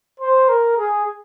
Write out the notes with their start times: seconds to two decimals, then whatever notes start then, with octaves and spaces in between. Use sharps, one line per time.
0.20 C5
0.49 A#4
0.77 G#4